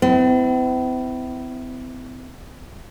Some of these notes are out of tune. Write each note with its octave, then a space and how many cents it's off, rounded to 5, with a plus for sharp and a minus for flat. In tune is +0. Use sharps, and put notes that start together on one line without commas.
C4 -45 E4 -5